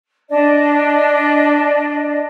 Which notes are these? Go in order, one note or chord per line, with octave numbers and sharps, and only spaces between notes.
D4 D5 D#5 A5